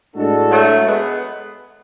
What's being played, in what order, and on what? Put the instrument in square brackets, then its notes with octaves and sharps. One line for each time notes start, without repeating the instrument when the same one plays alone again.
[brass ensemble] A2 G#3 D4 F#4 A4
[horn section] F#3 A3
G#3 B3